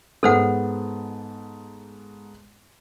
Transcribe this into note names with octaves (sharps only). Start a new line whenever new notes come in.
G#2 A3 B3 A4 C5 F#5